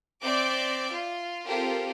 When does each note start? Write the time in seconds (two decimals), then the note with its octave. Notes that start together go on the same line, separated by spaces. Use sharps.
0.23 C4 D5 E5 D6 G6
0.90 F4
1.46 C4 F4 G4 A4 A#4